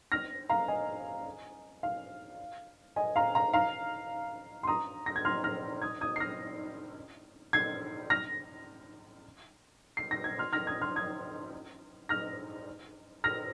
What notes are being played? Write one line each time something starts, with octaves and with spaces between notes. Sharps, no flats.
F6 A#6
F5 A#5
D#5 G#5
F5
D#5 G#5
F5 A#5
F5 A#5
F5 A#5
C6
A#5 D#6
A#6
G#6
C6 F6
F6 A#6
D#6 G#6
D#6 G#6
C7
F6 A#6
G#6 C7
F6 A#6
C7
A#6
G#6
C6 F6
F6 A#6
D#6 G#6
C6 F6
D#6 G#6
F6 A#6
F6 A#6